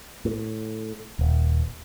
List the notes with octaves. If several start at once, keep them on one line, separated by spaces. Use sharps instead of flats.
A2
D#1